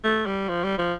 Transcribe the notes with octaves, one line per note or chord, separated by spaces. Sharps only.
A3
G3
F3
G3
F3